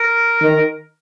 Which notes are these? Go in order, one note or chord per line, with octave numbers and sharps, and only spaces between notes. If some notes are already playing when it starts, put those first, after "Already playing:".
Already playing: A#4
D#3